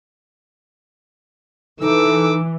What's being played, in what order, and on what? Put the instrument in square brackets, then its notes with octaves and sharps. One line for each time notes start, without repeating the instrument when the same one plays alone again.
[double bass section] E3 [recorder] D#4 [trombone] A4 [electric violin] D6 E6